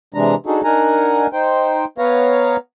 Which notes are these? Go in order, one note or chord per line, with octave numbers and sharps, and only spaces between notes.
C3 E3 G#3 D4 A#5
D4 D#4 F#4 G#4 A4
D4 D#4 A#4 F#5 G#5 A#5
D#4 C5 G5
B3 B4 C#5 F5 A#5